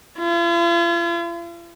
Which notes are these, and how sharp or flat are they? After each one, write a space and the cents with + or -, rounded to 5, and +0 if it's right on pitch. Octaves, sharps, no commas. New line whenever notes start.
F4 -45